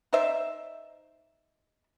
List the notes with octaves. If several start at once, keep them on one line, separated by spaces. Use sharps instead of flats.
D#4 C5 D5 E5